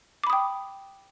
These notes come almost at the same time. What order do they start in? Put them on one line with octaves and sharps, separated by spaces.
D6 B5 D#6 G5